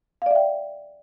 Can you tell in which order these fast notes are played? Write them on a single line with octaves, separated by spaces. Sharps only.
F5 D5 E5 G5